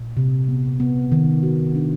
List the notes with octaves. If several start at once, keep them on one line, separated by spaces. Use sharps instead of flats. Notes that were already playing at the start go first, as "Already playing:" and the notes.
Already playing: A#2
C3
B3
B3
D#3
F#4
D4